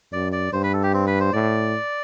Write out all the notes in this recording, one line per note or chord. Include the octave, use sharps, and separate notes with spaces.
F#2 D5
D5
G2 C5
B4
A4
G4
C4
B4
C5
A2 D5